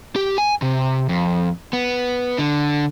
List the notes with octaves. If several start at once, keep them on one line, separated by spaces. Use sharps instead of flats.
G4
G#5
C3
F2
B3
D3